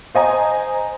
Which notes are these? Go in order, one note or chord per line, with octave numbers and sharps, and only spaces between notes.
C5 D#5 G#5 A#5